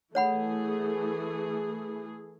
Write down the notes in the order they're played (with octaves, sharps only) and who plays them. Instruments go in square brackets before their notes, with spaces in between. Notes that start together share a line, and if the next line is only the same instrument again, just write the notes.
[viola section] E3 A3 G#4 [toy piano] C#5 F#5 B5